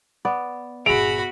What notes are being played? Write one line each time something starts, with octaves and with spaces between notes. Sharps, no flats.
B3 D5
G1 A#2 F#4 G#4 E5 B5 D7 F7